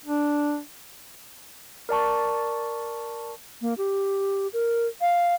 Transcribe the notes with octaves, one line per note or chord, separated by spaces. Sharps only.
D4
A#4 D5 A5 C#6
A#3
G4
A#4
F5